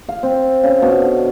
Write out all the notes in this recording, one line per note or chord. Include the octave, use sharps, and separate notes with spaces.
F5
C4
C#3
B2
D3